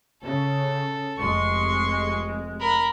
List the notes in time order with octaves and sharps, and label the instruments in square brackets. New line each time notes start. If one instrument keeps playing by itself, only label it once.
[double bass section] C#3 [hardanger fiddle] A4
[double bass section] F1 G#3 [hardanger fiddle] C6 C#6
[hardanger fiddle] A#4 B5